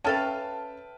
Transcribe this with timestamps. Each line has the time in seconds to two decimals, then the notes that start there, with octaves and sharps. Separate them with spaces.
0.04 C#4 A4 B4 E5 F5 G5 A5 F6